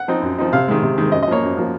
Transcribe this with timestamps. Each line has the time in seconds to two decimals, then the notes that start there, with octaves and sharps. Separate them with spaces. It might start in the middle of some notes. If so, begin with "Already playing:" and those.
Already playing: F#5
0.08 F3 C4 D#4
0.22 F#2
0.38 F3 C4 D#4
0.52 C3 F5
0.68 D#3 G#3
0.82 C3
0.98 D#3 G#3
1.12 F#2 D#5
1.23 D#5
1.28 F3 A#3 C#5
1.43 F#2
1.57 F3 A#3